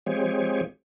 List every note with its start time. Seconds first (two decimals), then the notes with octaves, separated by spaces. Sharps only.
0.06 F3 G#3 C4 G4 G#4 C#5